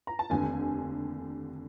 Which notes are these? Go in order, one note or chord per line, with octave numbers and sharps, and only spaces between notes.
A#5
A5
F1 D#2 D3 G#5